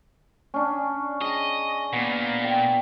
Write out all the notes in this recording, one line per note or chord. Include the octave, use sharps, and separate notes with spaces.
C#4 D4
G#4 D#5
A#2 B3
G5